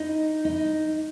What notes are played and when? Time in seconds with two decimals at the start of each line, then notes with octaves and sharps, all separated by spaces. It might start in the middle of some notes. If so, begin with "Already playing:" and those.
Already playing: D#4
0.45 D#4